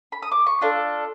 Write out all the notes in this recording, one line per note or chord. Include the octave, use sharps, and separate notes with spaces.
B5
D#6
D6
C#6
D4 F4 A4